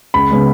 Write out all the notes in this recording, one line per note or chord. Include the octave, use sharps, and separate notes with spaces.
C#2 B5
C#3 G#3 B3